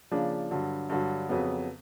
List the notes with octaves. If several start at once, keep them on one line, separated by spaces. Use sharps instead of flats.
C#3 F3 A#3 D4
G2 D3 F#3
G2 D3 F#3
F2 C#3 F#3 B3